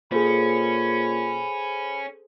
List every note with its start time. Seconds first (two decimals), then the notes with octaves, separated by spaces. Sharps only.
0.12 A#2 C#4 G#4 A4 C5 B5